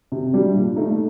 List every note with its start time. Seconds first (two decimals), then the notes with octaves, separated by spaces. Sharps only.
0.12 C3
0.33 G3 D4
0.54 A#2
0.76 A3 D#4